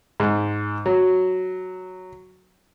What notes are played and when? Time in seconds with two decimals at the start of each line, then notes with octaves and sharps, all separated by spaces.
0.20 G#2
0.86 F#3